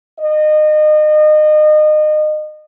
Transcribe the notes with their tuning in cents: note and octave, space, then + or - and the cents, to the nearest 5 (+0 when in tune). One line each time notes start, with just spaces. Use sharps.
D#5 -30